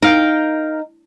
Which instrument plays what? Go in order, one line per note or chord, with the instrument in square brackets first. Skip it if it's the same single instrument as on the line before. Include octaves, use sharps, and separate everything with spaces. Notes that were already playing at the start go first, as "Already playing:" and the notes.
[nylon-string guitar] D#4 [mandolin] A#4 F5 G5